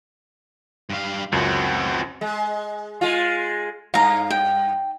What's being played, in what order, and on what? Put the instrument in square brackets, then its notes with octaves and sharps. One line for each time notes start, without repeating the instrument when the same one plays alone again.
[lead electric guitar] G2 F5
[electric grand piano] C#2 F#2 [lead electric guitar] C4 F#4
[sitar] G#3
G#3 F4
[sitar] G2 [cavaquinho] F5 A#5
[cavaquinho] G5